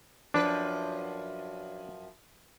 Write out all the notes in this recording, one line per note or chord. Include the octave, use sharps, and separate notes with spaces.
F#2 F3 D4 B4